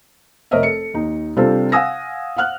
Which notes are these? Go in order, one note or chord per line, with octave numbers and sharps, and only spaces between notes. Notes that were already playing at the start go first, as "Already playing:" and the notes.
F1 A#4 C#5 D#5 E5
A4 C#7
D#2 D#4
C3 G3 C4 D4 F4 A4
F5 F#5 G#5 D#6 E6 A#6
F5 F#5 F6 F#6